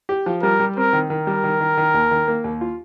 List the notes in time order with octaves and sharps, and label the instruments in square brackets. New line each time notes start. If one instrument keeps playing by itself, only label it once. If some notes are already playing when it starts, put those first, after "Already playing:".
[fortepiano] G4
F3
[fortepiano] G3 [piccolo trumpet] A#4
[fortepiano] G3
[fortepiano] C4 [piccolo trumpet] A#4
[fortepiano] D#3
[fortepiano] D#3 [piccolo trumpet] A#4
[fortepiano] G3
D#3
D#3
D#3
D#2
D#3
A#3
D#2
F4